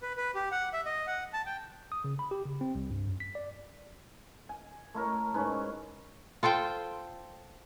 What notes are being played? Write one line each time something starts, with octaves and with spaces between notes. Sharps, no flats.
B4
B4
G4
F#5
E5
D#5
F#5
A5
G5
D#6
C#3
B5
G4
C#3
C4
C2
G2
F#2
B6
D5
G#5
A3 E4 A#4 C#5
G#2 C#4 B4
F4 A4 C5 G5